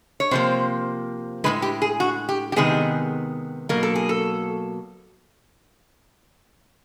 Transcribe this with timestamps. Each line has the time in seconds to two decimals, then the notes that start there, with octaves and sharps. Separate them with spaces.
0.20 C#5
0.31 C3 F3 A#3 C5
1.44 A2 E3 G#3 B4
1.62 G4
1.82 G#4
2.00 F#4
2.29 G4
2.52 G4
2.56 C3 D#3 G#3 B3 G#4
3.69 B2 F#3 A#3 A#4
3.83 A4
3.96 G#4
4.09 A4